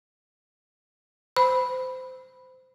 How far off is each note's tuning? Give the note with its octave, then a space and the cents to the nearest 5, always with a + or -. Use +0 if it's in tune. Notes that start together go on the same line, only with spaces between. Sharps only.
C5 -20 B5 +0